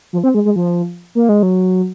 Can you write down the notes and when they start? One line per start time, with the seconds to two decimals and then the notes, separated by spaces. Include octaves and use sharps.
0.13 F3
0.24 C4
0.34 G#3
0.45 G#3
0.56 F3
1.15 A#3
1.29 G#3
1.43 F#3